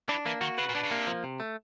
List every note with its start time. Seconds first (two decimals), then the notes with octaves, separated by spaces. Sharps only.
0.09 E3 D4
0.26 E3 A#3
0.41 D#3 F#4
0.58 C#3 B4
0.69 A#2
0.74 B2 D4
0.83 C#3
0.90 C3 A#3
1.07 F3
1.24 C3
1.40 A3